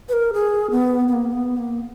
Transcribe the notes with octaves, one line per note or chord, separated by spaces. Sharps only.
B4
A#4
G#4
B3
B3
A#3
B3
A#3